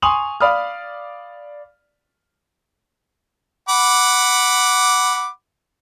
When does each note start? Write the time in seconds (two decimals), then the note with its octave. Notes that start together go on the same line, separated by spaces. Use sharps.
0.02 G#5 C6 C#6 D#6 F7 F#7
0.40 D5 F5 B5 D#6 F6
3.69 F#5 B5 D6